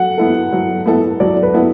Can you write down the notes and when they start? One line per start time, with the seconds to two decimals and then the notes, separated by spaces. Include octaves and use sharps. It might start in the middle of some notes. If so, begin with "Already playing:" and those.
Already playing: F#3 A4 F#5
0.18 B3 E4 A4
0.53 F#3
0.86 B3 E4 A4
1.20 F#3 D5
1.43 B4
1.54 B3 E4 A4